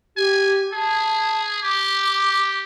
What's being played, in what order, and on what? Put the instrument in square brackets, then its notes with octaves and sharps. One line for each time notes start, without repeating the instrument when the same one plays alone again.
[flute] G4 [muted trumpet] G#5
[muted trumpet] G#4 [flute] A5
[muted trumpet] G4 [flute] D6